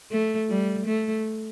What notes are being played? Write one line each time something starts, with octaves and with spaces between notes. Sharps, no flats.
A3
G3
A3